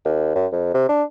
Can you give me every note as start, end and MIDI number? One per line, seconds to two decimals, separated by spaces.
0.05 0.31 39
0.35 0.46 42
0.52 0.71 41
0.74 0.84 48
0.89 1.03 62